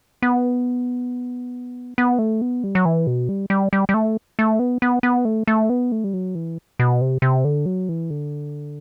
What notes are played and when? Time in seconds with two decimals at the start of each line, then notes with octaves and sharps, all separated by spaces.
0.22 B3
1.98 B3
2.19 A3
2.41 B3
2.64 G3
2.75 F#3
2.85 E3
3.07 B2
3.29 G3
3.50 G3
3.73 G3
3.89 G3
3.94 A3
4.39 A3
4.59 B3
4.82 B3
5.03 B3
5.25 A3
5.47 A3
5.70 B3
5.92 A3
6.04 G3
6.13 F#3
6.35 E3
6.79 B2
7.01 C3
7.22 C3
7.45 D3
7.66 F#3
7.89 E3
8.10 D3